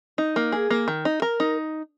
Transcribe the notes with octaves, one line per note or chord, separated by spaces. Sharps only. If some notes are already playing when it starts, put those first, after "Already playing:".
D#4
A#3
G#4
A#3
D#3
D#4
A#4
D#4